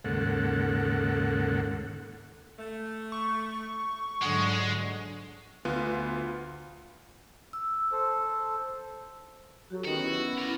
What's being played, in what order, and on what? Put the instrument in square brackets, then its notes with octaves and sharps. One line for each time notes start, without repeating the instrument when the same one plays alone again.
[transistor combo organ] D#2 G#2 C#3 A#3 A4 F#5
[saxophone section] A3
[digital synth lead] C#6
[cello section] G#2 D3 F#3 [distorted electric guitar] G#3 [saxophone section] F4 D#5 F#5
[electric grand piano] D2 B3 F4
[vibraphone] E6
[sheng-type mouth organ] A4 C5
[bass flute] F#3 [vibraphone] F#4 G4 A4
[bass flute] D#3 [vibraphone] B3 C#4 B4 [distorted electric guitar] F#4
[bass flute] E4
[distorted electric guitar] A#4 D5